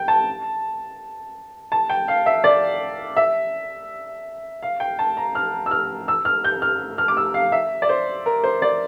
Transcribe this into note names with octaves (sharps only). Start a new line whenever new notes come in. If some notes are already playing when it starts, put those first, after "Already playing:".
Already playing: G5
A5
A5
G5
F5
E5
D5
E5
F5
G5
A5
A#5
F6
E6
F6
E6
F6
G6
F6
F6
D6
E6
F5
E5
D5
C5
A#4
C5
D5